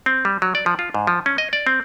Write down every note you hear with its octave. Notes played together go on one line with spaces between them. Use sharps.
C4
G3
F#3
D5
F3
F4
G#2
F3
C#4
D#5
D5
C4